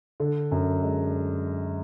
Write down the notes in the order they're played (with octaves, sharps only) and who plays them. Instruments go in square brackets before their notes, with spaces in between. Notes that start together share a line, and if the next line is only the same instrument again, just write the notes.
[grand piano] D3
F#2
G#3